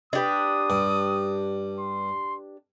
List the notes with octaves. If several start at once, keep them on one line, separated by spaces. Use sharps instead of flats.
D4 G4 B4 D#6
G2
C6